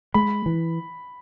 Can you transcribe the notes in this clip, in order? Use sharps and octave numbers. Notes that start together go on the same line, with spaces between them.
G#3 B5
E3